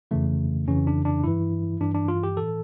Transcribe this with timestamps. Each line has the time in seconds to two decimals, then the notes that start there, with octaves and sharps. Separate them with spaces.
0.11 F2 C#3 E3 A3
0.67 F2 C#3 E3 C#4
0.87 D4
1.05 D4
1.24 G2 E3 E4
1.80 G2 E3 D4
1.94 D4
2.08 F4
2.23 G4
2.37 A2 E3 A4